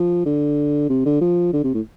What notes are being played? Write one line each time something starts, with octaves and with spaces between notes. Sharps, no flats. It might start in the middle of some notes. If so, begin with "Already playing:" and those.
Already playing: F3
D3
C3
D3
F3
D3
C3
A2